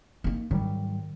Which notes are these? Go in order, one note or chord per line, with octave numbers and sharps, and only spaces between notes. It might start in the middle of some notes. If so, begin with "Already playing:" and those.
A#3 D#4
G#2 D#3 F#3 G3